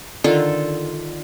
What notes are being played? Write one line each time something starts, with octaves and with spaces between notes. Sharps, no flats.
D3 D#3 F4 A4